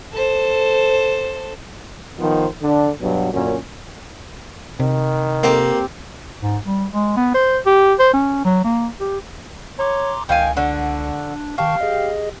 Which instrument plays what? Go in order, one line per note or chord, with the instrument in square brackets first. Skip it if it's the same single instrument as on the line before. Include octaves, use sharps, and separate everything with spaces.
[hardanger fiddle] A4 C5
[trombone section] D#3 F3 B3 D#4 C5
D3 D4
G2 B2 F#3
F#2 A#2 D3 C#4
[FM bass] C3 [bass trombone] D#3
[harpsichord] A#3 [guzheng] C4 G4
[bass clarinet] G#2
G3
G#3
B3
C5
G4
C5
C#4
F#3
A#3
G4
[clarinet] C#5 [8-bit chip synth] A#5 C6 D6
[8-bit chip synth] C#2 [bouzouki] D#3 F5 G#5 [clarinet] G5
[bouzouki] D3 F#4 [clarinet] D4
[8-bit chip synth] D#3 A5 C#6 [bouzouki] G4 [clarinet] F5
[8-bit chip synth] G#4 D#5